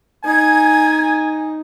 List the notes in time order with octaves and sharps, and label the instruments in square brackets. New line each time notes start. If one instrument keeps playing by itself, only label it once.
[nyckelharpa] D#4 [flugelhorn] G#5 [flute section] G#6